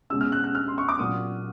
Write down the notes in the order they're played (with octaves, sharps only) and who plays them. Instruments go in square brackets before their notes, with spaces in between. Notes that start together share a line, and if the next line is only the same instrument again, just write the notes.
[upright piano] B2 G#3 C#4 E6
F6
F#6
F#6
F6
C6
C#6
D6
A#2 F#3 A#3 D#6